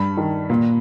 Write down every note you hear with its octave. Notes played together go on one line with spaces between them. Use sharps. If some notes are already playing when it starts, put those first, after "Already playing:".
Already playing: G2 B5
D#3
A#2